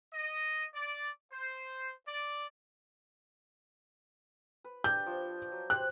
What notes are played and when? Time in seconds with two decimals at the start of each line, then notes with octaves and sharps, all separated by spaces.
0.13 D#5
0.74 D5
1.32 C5
2.07 D5
4.64 B4
4.84 D4 G4 G6
5.06 F3
5.52 F#3
5.70 G4 C5 F#6